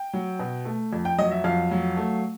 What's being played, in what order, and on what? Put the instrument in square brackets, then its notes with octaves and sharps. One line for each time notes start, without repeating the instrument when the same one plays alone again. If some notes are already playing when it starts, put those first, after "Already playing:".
Already playing: [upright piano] G5
F#3
B2
A3
F2
G5
F#3 D#5
E5
F2 F5
F#3
A3